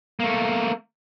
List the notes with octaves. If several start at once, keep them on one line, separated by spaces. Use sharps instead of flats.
A3 A#3